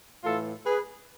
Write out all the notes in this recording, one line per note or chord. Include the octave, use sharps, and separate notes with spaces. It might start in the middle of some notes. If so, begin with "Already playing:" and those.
A2 E3 A3 F4 A4
G#4 B4